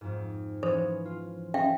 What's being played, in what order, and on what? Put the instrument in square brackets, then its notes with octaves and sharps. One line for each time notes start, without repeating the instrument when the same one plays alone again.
[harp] F2 G#2
[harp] E3 F3 C#4 [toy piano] C5
[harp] F4
[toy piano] E5 F5 G5